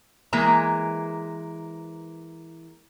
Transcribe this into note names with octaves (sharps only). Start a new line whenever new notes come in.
E3 G#3 A#3 A#5